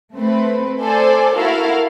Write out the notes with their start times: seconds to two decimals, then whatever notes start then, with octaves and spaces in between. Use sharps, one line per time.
0.14 A3 C4 B4
0.81 A4 C5 D5 G#5
1.35 E4 F#4 A4 A#4 F5